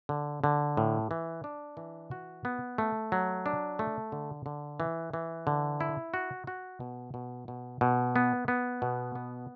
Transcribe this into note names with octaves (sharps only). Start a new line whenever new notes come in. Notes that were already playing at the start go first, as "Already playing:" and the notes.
D3
D3
A2
E3
D4
E3
F#4
B3
A3
F#3
D4
A3
D3
D3
E3
E3
D3
E4
F#4
F#4
B2
B2
B2
B2
B3
B3
B2
B3